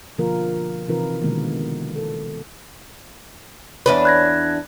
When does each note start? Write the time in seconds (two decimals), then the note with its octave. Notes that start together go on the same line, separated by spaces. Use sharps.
0.18 B2 D3 F3 A#3 F4 A#4
0.88 C3 E3 D#4 F4 A#4 B4
1.21 B2 D3 D#3 G#3 A#3 B3
1.96 A4
3.86 E2 D4 B4 C#5
4.05 F#6 G#6 A#6